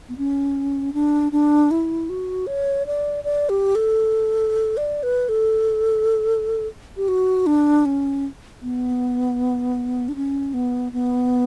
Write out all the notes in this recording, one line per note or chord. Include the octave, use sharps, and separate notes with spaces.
B3
C#4
D4
D4
E4
F#4
C#5
D5
D5
G4
A4
D5
B4
A4
G4
F#4
D4
C#4
B3
D4
C#4
B3
B3